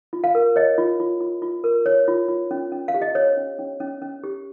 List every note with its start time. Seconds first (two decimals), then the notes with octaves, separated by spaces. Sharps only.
0.13 F4
0.24 F5
0.35 A#4
0.56 C#5 D#5
0.78 F4
1.00 F4
1.21 F4
1.42 F4
1.64 A#4
1.86 C#5
2.08 F4
2.29 F4
2.51 C#4
2.72 C#4
2.88 F5
2.94 G4
3.02 D#5
3.15 C5 C#5
3.37 C#4
3.59 C#4
3.80 C#4
4.02 C#4
4.24 G4